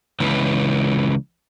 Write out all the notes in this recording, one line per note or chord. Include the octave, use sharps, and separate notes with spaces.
C#2 E3